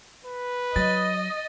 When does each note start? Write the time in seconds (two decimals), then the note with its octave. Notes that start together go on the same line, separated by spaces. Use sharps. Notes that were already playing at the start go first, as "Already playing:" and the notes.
0.25 B4
0.76 F#3 D#5 A6